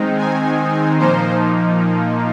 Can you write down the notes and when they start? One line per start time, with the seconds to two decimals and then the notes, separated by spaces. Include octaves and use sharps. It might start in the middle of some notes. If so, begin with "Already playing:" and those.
Already playing: D#3 G#3 C4 D#4
0.18 G#5
0.98 A#2 F3 A#3 D#4 C5